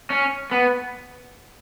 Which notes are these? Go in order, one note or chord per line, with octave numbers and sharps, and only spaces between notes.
C#4
B3